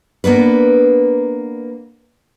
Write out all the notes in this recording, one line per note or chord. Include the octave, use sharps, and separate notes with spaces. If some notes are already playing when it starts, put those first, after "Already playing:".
A#3 B3 D4 B4